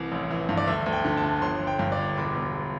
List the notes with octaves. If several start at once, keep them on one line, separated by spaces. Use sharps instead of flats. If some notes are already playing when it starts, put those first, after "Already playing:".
Already playing: C2 E3
A1
E3
G2
D5
D2 E5
D2
G5
D3
A5
D3
G1 C6
G1
G5
G2
D5
G1
E1 D6
E1